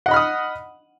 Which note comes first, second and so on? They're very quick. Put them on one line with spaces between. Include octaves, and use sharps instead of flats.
F#5 D#5 B5 F6 D#6